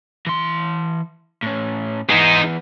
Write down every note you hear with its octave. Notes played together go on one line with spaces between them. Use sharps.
E3 C6
A2 C#4
E3 G#3 B3 D#4